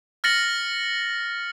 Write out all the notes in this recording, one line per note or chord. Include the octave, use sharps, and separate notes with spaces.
F6 A6 A#6 C#7 F#7